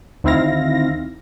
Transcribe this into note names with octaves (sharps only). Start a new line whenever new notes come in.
D2 D#3 C4 E4 F5 A#6